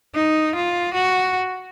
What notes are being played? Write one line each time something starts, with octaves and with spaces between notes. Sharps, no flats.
D#4
F4
F#4